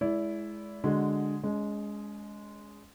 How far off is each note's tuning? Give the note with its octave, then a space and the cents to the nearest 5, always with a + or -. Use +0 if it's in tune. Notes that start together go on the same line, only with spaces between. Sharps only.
G#3 +20 E4 +0 D5 -35
D3 +0 G#3 +0 F#4 +0
G#3 +0 C#4 +35